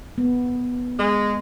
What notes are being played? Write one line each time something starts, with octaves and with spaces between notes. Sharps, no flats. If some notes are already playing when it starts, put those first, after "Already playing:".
B3
G#3